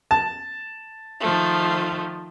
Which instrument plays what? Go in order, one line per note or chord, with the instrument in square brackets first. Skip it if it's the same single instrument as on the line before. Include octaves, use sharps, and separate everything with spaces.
[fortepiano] A5
[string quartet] D#3 F3 A3